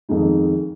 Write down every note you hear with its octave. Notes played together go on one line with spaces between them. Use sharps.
F2 D#3 G#3 D#4